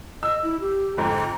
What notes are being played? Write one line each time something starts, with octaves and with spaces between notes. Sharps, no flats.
D#5 E6
E4
G4
F2 G#2 D3 A#5